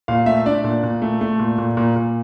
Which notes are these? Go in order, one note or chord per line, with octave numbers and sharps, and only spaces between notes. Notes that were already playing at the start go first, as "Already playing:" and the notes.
A#2 F5
A3 E5
D4 D5
A#2
A#2
A3
A3
A#2
A#2
A#2
A#2